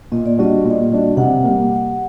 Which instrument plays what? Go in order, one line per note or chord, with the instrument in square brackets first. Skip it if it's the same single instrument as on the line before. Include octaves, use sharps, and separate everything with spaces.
[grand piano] A#2 [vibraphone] D#5
[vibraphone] D5
[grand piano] G3 D4 F#4 [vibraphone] D#5
[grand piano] A#2
G3 D4 F#4
[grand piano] C3 [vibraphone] F#5
[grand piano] G3 A#3